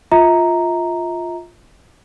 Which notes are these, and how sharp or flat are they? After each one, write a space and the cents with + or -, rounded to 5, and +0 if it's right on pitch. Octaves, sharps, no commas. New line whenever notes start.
F4 +0 E5 -40 A#5 +0